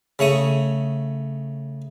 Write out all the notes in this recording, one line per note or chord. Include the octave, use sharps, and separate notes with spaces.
C#3 A3 C#5 D#6